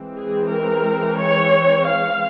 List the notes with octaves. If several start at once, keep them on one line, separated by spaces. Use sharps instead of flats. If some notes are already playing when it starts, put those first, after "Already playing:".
Already playing: E3 G#3 C4
G#4
A#4
C#5
F5